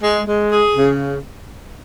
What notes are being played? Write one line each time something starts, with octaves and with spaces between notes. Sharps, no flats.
G#3
G#3
G#4
C#3